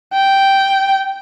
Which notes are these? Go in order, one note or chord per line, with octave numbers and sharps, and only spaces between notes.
G5